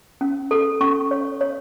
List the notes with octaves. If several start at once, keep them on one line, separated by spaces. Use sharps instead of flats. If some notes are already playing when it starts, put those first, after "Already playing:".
C#4
A4
C#4 C#6
C#5
C#5